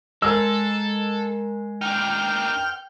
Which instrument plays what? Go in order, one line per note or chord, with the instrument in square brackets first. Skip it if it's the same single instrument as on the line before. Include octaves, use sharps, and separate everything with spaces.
[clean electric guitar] G#3 [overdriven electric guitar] A4 [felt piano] A#4 E6
[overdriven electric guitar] D4 D#4 [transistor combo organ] G5 F6